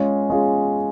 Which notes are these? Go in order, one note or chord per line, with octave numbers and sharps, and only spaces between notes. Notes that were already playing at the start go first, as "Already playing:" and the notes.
Already playing: G#3 C#4 F4 G#4
G#3 C#4 F4 G#4